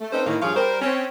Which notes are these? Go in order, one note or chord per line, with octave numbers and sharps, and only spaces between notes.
A3
C4 C#4 D#4 A4 B4 C5
A2 D#3 A#3
G2 F3 G#4 C#5 F5
G3 A#4 C5
C4 C#4